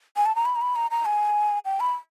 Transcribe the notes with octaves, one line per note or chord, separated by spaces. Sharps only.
G#5
A5
A#5
B5
A#5
B5
A#5
A#5
G#5
G5
B5